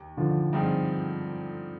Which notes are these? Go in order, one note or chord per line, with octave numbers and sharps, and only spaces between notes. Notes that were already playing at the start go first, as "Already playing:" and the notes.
Already playing: D#2
D3 F3
G2 F3 C4 D#4 G#4